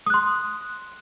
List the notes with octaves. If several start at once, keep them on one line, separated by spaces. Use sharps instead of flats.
C6 D#6 F#6